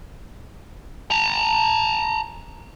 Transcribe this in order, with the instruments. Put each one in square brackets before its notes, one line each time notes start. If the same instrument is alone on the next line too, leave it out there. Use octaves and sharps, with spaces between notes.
[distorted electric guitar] A5 A#5